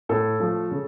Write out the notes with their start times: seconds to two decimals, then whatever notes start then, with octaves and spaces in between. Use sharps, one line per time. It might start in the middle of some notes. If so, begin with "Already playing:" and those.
0.09 A2 A4
0.40 F3 A3
0.71 C#3